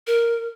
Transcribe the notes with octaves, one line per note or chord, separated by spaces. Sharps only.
A#4